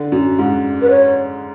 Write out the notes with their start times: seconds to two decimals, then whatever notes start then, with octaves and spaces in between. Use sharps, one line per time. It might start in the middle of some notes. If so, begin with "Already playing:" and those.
Already playing: D3
0.12 F#2
0.39 G#2
0.82 B4
0.90 C#5